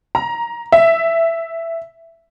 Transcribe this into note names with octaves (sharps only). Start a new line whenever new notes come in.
A#5
E5